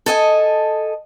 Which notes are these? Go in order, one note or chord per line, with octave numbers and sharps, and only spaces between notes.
A4 D#5 G#5